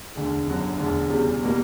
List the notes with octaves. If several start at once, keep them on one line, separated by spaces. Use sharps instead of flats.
E1 D2 D3
G1 F#2 D3 F#3
E1 D2 D3
E1 E2 C#3 G3
B2 G3 A#3